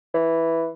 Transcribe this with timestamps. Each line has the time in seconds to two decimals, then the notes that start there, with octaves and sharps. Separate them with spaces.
0.14 E3